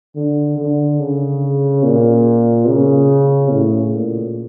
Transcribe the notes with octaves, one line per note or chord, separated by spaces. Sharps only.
D3
D3
C#3
A#2
C#3
A2
A#2